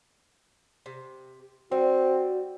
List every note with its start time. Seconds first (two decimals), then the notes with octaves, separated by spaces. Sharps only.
0.86 C3
1.72 G3 C4 F#4